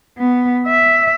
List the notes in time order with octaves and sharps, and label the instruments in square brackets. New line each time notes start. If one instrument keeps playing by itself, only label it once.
[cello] B3
E5